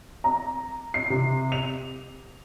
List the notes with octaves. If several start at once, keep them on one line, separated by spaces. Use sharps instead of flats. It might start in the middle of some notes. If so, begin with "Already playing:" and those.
A#5
C7
C3
F7